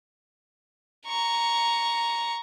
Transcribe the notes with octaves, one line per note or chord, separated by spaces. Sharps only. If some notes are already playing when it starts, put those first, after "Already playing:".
A#5 C#6